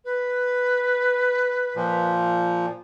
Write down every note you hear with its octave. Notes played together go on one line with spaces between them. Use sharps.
B4
A#2 F3